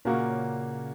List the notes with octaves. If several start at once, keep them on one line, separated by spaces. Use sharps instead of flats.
A#2 C#3 A#3 F#4